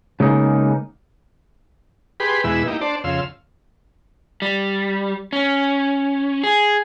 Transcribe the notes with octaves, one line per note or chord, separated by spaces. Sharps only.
C#3 G#3 A#3 B3 D#4
G4 G#4 B4 B5 C6
E2 B2 E3 G#3 B5 E6
A#3 D#4 E4 G4
D4 C5 D5 A5
F2 C#3 F5 C6 E6
G3
C#4
G#4